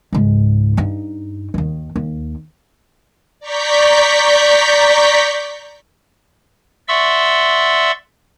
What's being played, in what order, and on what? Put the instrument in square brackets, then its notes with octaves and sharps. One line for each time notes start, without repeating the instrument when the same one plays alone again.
[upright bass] C#2 G#2
G2 D#4
D#2 D#3
D#2
[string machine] D5 A#5 C#6 G6 B6
[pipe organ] D5 E5 F#5 C6 C#6 E6